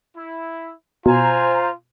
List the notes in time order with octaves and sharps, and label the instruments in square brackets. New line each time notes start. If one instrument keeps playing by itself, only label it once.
[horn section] E4
[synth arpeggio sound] B2 [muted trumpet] F4 [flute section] C5 A#5 [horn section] G#5